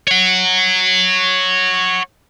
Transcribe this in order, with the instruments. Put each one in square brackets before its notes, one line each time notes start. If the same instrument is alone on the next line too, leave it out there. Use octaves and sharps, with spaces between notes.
[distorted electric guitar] C#5 F#5